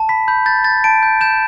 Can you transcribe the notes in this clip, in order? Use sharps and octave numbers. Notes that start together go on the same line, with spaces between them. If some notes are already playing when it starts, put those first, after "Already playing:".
Already playing: A5
B5 B6
B5 G6
G6 A6
G6 A6
A5 D7
G6
G6 E7